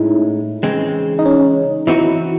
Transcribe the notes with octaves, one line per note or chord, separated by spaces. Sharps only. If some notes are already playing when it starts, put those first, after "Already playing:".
Already playing: A2 G#3 C#4 D#4 E4
C#3 E3 G#3 C4
D#4
C#4
E3 C4 D#4 E4 F#4